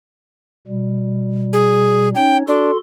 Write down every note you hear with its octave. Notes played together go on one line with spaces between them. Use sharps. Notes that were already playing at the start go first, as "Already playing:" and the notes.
B2 G3
G#4
C#4 D#4 C#5 G5
D4 F#4 A4 C6